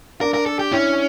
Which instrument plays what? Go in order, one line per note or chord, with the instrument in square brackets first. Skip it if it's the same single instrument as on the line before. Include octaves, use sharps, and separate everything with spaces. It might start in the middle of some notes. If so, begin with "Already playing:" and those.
[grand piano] D4 [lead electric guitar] A#4
[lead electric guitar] A#4
A4
G4
[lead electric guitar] C#4 [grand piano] E4